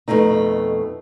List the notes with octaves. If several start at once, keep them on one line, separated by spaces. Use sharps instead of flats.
F2 B2 E3 G#3 A3 D#4